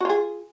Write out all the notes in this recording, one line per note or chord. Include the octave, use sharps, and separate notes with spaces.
F4 F#4 G#4